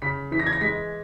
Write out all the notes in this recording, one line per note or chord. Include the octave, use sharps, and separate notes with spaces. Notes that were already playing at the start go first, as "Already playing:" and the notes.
C#3 B6
E3 B6
A#6
G#6
A#6
G#3 B6